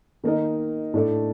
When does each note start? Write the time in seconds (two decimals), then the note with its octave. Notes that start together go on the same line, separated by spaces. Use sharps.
0.24 D#3 A#3 D#4 A#4 D#5
0.94 A2 A3 D4 A4 D5